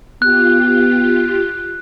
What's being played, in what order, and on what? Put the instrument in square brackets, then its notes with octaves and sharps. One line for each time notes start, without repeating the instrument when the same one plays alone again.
[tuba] B3 [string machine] F4 G4 [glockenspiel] F#6